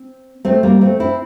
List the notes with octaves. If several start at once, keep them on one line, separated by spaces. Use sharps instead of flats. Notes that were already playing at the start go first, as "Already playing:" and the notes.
Already playing: C4
A3 C4
G3 A#3
A3 C4
C4 E4